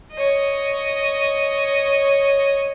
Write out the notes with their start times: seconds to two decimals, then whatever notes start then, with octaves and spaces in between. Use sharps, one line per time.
0.14 C#5 D#5